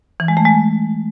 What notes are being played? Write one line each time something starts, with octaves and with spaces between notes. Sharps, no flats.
E3
G#3
A3
G#3